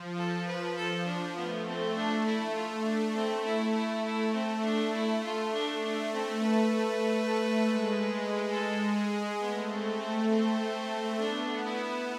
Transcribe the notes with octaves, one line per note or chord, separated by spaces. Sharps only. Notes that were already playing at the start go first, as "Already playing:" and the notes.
Already playing: F3
A4
B4
A4
D4
A3 B3
C4
D4
E4
F4
D4
C4
E4
E4
A3 E4
C4
D4
E4
F4
D4
A3 D4
C4
B4
G#3
A4
G#4
A3 B3
C4
C4
C4
B3 D4
E4